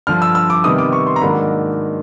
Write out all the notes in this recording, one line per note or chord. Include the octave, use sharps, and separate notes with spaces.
G2 D3 F3 F6
E6
E6
D6
C3 D#3 G3 B3 D#6
D6
C#6
C6
A#5
G#2 D#3 F#3 A#3 D4 B5